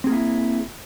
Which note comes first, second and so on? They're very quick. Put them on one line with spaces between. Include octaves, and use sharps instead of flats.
C4 G#4 A#3 E4